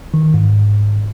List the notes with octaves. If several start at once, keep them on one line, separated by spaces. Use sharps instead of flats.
D#3
G#2